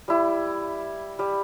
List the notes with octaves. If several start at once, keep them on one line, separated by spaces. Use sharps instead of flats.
G3 E4
G3